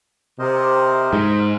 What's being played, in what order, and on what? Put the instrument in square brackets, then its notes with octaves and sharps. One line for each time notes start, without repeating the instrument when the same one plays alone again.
[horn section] C3 [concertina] A#4 C5 D#5
[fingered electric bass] G#2